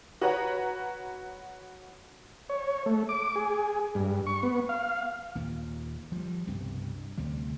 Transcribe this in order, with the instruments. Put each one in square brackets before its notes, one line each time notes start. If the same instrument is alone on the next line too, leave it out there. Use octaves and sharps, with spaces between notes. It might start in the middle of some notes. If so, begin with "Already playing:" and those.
[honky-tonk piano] F#4 B4 C#5 F#5 A#5
[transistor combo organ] C#5
A3
D6
G#4
G2
C#6
B3
F5
[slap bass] D#2 A#2
F3 G3
C2 G2 B2
D2 C3 G3